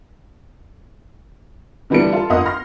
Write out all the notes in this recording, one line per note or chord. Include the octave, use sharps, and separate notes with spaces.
D3 E3 G3 B3 A4 C#7
F4 A4
G1 F4 A#4 D#5 F#5 D#6
C6 F6 A#6